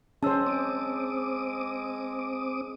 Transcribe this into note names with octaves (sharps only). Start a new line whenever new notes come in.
G#3 C#4 C5 A5 E6
C4 D6 D#6